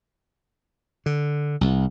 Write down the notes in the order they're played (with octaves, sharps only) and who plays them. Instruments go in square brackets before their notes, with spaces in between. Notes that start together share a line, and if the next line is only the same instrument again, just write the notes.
[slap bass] D3
C2